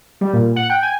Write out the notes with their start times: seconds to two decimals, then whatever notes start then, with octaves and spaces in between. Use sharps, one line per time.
0.21 G3
0.33 A#2
0.56 F#5
0.70 G5
0.83 G#5